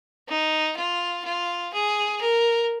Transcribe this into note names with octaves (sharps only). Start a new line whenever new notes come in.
D#4
F4
F4
G#4
A#4